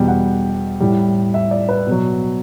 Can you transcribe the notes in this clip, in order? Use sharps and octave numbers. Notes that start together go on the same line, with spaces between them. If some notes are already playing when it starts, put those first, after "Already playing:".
Already playing: E2 B2 G3 G5
F#5
A2 G3
E5
D5
B4
B2 F#3